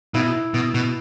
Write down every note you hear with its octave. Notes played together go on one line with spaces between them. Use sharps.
B2 E4
B2
B2